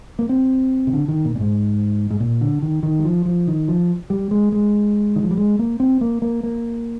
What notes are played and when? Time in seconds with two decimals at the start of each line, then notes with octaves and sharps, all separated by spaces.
0.19 A#3
0.29 C4
0.87 C3
0.93 D3
1.08 D#3
1.25 A#2
1.35 A#2
1.40 G#2
2.10 G#2
2.20 A#2
2.41 D3
2.62 D#3
2.83 D#3
2.99 G3
3.05 F3
3.26 F3
3.47 D#3
3.68 F3
4.10 G3
4.31 G#3
4.52 G#3
5.16 D#3
5.23 F3
5.31 G3
5.37 G#3
5.59 A#3
5.80 C4
6.01 A#3
6.22 A#3
6.43 A#3